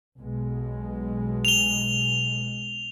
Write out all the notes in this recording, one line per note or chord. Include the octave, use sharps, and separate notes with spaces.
B1 B2 G#3
F7 G7